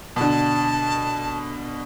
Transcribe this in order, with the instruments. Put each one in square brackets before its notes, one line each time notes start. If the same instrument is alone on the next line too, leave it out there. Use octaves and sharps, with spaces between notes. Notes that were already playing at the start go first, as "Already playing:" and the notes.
[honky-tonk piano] B2 D3 [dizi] A5